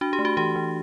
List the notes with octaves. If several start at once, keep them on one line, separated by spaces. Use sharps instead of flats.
D4 F#4
G4
A3
F#4
E3 G4
E3